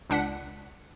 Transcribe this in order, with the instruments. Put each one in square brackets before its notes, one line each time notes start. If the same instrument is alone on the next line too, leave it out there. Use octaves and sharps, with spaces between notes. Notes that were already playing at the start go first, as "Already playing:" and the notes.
[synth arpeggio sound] C#2 D4 F#5 B6